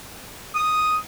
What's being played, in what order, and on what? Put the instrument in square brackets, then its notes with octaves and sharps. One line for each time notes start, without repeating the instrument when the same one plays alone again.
[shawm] D#6